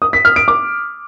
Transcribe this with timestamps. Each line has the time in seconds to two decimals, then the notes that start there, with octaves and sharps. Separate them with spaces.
0.02 D#6
0.13 B6
0.25 F6
0.36 D7
0.48 D6